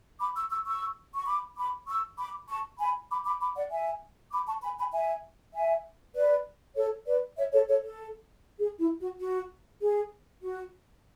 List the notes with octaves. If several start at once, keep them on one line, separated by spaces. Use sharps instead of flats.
B5 D6
C#6 E6
C#6 E6
C#6 E6
C#6
B5 D6
B5 D6
C#6 E6
B5 D6
A5 C#6
G#5 B5
B5 D6
B5 D6
B5 D6
D5 F#5
E5 G#5
B5 D6
A5 C#6
G#5 B5
G#5 B5
E5 G#5
E5 G#5
B4 D5
A4 C#5
B4 D5
C#5 E5
A4 C#5
A4 C#5
A4
G#4
E4
F#4
F#4
G#4
F#4